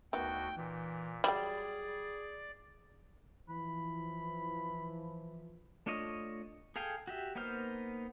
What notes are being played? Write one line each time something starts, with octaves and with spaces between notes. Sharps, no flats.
D2 D#3 B3 F#4 G5
A#2 E3
F#3 G3 G#4 D5 G5
E3 F3 B5
A3 D4 F4 C#5 D#5
G#4 A4 F5 G5 G#5
F#4 G4 E5
A#3 B3 D#4 C5 F6